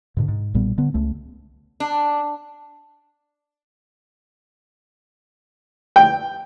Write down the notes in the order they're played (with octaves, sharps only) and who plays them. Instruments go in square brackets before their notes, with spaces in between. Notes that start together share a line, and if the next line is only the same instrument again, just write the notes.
[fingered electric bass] G#2 B2 D3
G#2
B1 A#2 G3 B3
D3 B3
C#2 A3
[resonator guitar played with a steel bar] D4
[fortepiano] G5